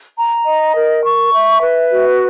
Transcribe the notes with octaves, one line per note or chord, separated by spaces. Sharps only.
A#5
D#5
A#4
C#6
E5
B4
F#4